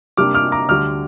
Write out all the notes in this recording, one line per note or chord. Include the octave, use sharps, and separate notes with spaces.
C3 G3 A#3 D4 D6 F6
D6 F6
A#5 D6
D2 D3 G3 D6 F6